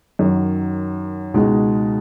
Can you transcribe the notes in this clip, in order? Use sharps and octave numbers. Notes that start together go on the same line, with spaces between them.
F#2 D#3 F#3
C#2 B2 G#3 D#4 F#4